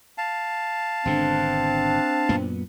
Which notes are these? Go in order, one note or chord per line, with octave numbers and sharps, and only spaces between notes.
F5 A5
G#1 B2 D3 C4 D4
F#2 A#2 B3